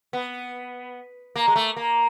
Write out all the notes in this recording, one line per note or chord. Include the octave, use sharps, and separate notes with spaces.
B3
A#3
G#3
A3
A#3